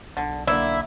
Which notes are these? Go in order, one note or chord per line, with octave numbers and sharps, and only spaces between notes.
B1 D3
D3 A#3 D4 E4 E5